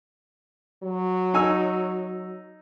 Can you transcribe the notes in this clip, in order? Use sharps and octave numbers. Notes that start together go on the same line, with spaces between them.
F#3
D#4 G#5 E6